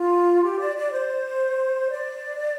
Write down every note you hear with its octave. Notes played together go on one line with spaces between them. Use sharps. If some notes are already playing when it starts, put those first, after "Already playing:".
Already playing: F4
G4
D5
D5
C5
D5